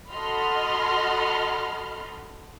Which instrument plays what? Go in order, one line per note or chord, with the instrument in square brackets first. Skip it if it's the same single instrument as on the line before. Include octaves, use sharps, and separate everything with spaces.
[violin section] F#4 A4 D#5 B5 C6 F6